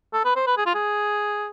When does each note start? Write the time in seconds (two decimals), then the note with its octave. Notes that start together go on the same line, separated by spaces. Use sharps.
0.13 A4
0.25 B4
0.36 C5
0.47 B4
0.57 G#4
0.66 F4
0.74 G#4